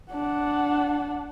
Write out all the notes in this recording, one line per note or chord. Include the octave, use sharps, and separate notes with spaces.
D4 F#5